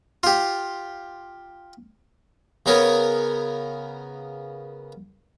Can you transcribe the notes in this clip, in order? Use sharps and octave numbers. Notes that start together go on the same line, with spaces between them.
F4 G4
C#3 B3 A#4 C#5 D#6